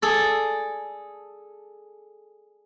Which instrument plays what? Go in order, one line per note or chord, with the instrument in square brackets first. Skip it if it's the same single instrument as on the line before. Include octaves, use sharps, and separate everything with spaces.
[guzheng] G#4 A4 D5